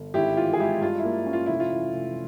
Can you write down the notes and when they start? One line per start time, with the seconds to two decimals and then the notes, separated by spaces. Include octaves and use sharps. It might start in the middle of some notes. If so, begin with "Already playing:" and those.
Already playing: G1
0.14 G#1 E4 G4
0.37 E3 F4
0.53 G#4
0.59 G#3 E4 G4
0.81 G2 F4
0.98 E4
1.04 A#3
1.26 C#4
1.33 F4
1.46 F1 E4
1.60 F4
1.71 E3
1.94 F1